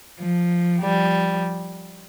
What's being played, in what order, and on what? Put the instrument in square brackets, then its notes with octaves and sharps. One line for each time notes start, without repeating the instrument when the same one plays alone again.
[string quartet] F3
F3 G3